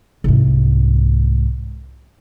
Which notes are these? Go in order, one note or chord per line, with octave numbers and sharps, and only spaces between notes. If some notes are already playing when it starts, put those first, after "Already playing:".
C2 G#2